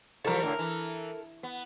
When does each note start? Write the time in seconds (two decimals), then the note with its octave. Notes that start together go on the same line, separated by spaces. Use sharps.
0.25 E3 F3 G3 A4 A#4
0.43 A2 D3
0.59 E3
1.43 B3